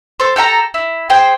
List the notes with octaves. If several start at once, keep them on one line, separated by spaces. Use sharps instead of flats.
A4 C5
G4 A4 G5 A#5
E4
G#4 C5 G5